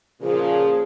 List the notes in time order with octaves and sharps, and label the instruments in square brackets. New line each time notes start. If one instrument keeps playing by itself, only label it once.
[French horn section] A#2 C#3 F3 [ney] G#4